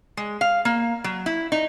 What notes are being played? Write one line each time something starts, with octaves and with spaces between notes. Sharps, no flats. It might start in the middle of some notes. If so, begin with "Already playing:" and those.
G#3
F5
A#3
F#3
E4
D#4